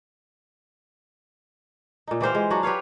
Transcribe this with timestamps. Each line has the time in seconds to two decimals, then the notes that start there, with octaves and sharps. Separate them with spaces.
2.07 A#2 D#4
2.21 E3 G4 C5 F5
2.35 G#3
2.51 F#3 D4 F#4
2.63 G4 B4 C#5 F5